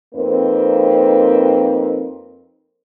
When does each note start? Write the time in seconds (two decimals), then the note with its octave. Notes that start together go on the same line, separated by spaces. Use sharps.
0.15 F2 A#3 C4 D#4 A#4 B4